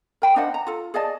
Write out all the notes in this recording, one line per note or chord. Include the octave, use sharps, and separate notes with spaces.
A#4 G5 B5
D4 C5 D#5 F#5
A#5
F4 A4
G#4 D5 D#5 A5